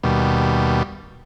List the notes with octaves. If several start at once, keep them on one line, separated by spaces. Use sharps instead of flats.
D#2 B2 G3